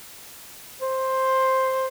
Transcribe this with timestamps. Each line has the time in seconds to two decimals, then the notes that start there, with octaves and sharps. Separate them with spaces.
0.82 C5